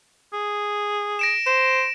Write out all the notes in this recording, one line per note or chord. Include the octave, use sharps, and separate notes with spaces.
G#4
A#6 D7 E7
C5 E7